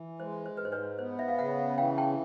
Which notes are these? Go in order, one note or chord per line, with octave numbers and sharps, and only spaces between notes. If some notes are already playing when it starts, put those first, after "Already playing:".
Already playing: E3
G#3 C5
C5
G#2 B4
C5
B4 C#5
B3 C5
E5
F5
C#3 E5 F#5
E3 F5 G5
G5 A5